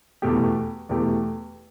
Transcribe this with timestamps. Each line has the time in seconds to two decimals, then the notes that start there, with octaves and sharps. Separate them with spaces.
0.22 E2 B2 A3 G4
0.89 E2 B2 A3 G4